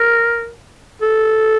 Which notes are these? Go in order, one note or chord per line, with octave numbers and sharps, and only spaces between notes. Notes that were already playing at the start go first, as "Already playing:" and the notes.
Already playing: A#4
A4